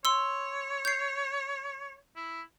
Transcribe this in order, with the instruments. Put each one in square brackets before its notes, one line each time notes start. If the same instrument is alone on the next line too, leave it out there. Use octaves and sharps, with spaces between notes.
[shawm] C#5 [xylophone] C6 E6
[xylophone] G6 C7
[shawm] E4